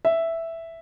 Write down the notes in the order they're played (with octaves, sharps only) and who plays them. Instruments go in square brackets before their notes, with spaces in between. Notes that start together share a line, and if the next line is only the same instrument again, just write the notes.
[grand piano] E5